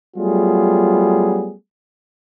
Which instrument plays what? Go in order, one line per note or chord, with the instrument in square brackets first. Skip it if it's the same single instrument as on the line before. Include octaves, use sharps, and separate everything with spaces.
[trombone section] F#3 G3 A3 B3 F4 G#4